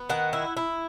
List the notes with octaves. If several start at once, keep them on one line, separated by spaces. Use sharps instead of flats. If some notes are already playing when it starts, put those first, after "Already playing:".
Already playing: B3
D#3 F#5
E4
E4